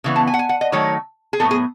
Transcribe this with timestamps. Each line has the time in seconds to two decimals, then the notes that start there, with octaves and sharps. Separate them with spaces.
0.04 C#3 E3 B3
0.16 A5
0.27 G#5
0.34 F#5
0.39 G#5
0.49 F#5
0.61 D#5
0.72 D#3 F#3 A3 C#5
1.33 G#4
1.40 A2 F#3 B3 A4
1.51 G#4